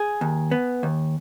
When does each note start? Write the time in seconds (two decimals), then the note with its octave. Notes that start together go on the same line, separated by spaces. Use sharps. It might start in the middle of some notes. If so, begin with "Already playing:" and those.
Already playing: G#4
0.21 D#2
0.51 B3
0.83 D#2